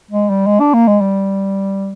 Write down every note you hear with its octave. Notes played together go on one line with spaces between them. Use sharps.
G#3
G3
G#3
D4
A#3
G#3
G3